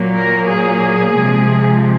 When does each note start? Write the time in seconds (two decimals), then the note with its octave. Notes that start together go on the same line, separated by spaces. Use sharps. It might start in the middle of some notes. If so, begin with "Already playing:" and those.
Already playing: A#2 F#3 A#3
0.17 A#4
0.50 G#4
1.14 C3 F3 G#3